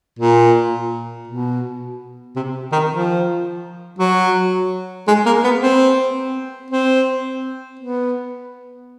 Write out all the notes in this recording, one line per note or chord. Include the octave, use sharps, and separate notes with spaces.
A#2
B2
C3
D#3
F3
F#3
G#3
A#3
B3
C4
C4
B3